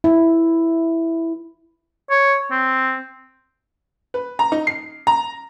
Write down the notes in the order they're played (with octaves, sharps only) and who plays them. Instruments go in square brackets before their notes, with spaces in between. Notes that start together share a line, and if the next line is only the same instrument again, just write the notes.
[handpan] E4
[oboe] C#5
C4
[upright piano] B4
A#5
D#4
C7
A#5